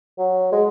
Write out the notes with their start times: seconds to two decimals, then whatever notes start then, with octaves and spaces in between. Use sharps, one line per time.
0.18 F#3
0.52 G#3